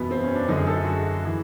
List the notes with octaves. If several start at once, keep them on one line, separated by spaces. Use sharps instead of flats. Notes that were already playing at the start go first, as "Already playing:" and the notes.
Already playing: F#1 E2 B2 B3
C4
C#4
D4
F#1 F#2 D3 D#4
G#4
A4
G#4
F#4
E3